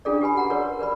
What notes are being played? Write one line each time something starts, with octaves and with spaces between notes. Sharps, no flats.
C#4 D4 F4 G#4 A4 D5
G4 B4 G#5 B5
F#4 F#5 A#5
F#4 G#4 A#4 B4 C#5 D5
A#4 B4 D5 B5